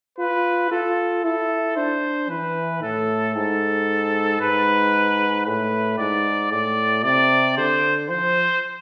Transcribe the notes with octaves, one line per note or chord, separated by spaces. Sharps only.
F4 B4
F4 A4
E4 A4
D4 C5
E3 B4
A2 A4
G#2 A4
G#2 B4
A2 B4
G#2 D5
A2 D5
C3 D5
D3 C5
F3 C5